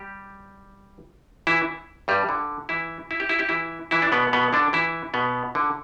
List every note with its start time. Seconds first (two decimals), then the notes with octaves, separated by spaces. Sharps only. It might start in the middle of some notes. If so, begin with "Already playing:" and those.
Already playing: G3 G4
1.47 E3 E4
2.08 G2 G3
2.29 D3
2.69 E3 E4
3.11 E4
3.20 G4
3.29 E4
3.39 G4
3.49 E3 E4
3.91 E3 E4
4.02 D4
4.12 B2 B3
4.33 B2 B3
4.53 D3 D4
4.73 E3 E4
5.14 B2 B3
5.55 D3